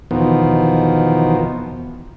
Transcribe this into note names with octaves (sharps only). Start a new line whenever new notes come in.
E2 B2 D#3 F3